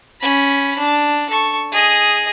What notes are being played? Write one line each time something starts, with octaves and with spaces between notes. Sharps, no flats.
C#4 B5
D4
A4 C#6
G#4 D#5